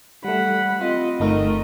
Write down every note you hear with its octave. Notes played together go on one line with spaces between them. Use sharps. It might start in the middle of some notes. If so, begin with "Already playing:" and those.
G3 A3 F#5 B5
C4 F4 D#5
G1 A3 D#4 A#4 D#5